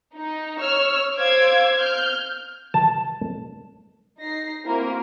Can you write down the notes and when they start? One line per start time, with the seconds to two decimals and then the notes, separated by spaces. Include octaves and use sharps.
0.15 D#4
0.60 C#5 E6 F6
1.18 C5 F5 D6 E6 G#6
1.77 F6 G6
2.74 A5
4.19 D#4 A#6 C7
4.65 A#3 C4 E4 F#4 A#4